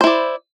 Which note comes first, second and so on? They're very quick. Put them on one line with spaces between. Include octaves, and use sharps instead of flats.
C5 E4 D5